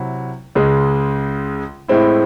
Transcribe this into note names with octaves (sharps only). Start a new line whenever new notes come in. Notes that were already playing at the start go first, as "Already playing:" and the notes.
Already playing: C3 F#3 E4
C#2 C#3 G#3
A2 G#3 C4 E4